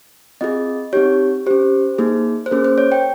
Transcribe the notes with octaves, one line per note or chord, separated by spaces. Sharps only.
C4 F4 G#4 D#5
C4 D#4 G4 C#5
C#4 G4 C5
A#3 D#4 G#4
C5
A#3 C#4 G#4 A#4
C5
C#5
G5